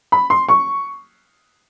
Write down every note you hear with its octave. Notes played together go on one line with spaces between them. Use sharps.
B5
C6
C#6